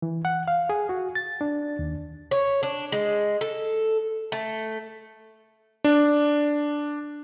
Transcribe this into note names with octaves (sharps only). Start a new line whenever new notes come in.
E3
F#5
F5
G#4
F#4
A6
D4
D#2
C#5
D4
G#3
A4
A3
D4